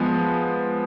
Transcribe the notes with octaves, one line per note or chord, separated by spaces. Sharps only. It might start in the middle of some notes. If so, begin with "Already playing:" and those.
Already playing: F3 G#3 B3